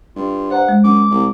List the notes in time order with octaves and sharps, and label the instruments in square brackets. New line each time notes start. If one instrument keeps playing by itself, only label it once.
[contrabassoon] G2 [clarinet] F4
[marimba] C5 A#5 [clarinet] F#5
[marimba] G#3
[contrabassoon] F#2 [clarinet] D6
[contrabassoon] C2